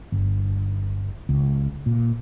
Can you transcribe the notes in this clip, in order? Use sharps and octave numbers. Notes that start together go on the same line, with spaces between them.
G1
C#2
A#2